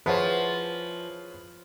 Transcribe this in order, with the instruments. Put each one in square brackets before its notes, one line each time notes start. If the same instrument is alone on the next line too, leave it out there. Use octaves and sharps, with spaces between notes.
[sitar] F3 [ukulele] E4 E5 F#5 [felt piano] G#4 C#5 [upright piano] B4